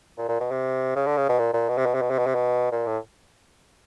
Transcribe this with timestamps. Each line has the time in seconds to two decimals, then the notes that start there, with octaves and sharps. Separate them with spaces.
0.18 A#2
0.28 A#2
0.40 B2
0.51 C3
0.96 C#3
1.06 D3
1.17 C#3
1.29 B2
1.39 A#2
1.53 A#2
1.69 B2
1.77 C3
1.86 B2
1.94 C3
2.02 B2
2.10 C3
2.18 B2
2.27 C3
2.35 B2
2.71 A#2
2.86 A2